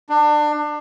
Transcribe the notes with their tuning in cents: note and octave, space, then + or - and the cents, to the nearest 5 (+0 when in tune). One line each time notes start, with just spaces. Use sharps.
D4 +25